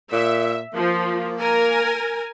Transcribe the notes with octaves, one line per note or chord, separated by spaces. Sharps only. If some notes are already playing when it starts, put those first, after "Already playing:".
A#2 E5
F3 A#3
A#4 G#5